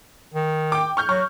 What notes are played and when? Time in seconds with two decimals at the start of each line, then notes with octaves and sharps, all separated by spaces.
0.34 D#3
0.72 G5 D6
0.97 C#6 F6 G6
1.09 F#3 C#6